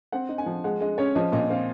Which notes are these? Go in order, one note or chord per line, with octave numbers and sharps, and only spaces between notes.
C4 F#5
D#4
G#5
F3
G#3 F#5
G#3 D#5
C#4 C#5
F3 D#5
A#2 D#5
C4 F5